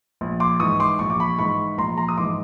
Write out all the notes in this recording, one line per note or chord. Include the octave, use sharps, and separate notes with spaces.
A#1
C6 D6
G#2 E3 C#6 D#6
C6 D6
A#1 C#6
D6
B5 C#6
G#2 E3 B5 C#6
A#1 A#5 C6
A#5 C6
D#6
G#2 E3 C6 D6